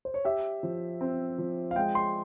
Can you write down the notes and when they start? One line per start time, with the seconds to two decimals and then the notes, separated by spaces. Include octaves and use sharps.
0.05 C5
0.14 C#5
0.25 G4 E5
0.63 F3
1.01 C4
1.38 F3
1.71 F5
1.76 G#3 G5
1.95 C6